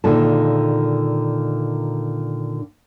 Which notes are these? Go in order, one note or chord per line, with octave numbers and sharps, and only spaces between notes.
A#2 D3 D#3 G#3 F4 A5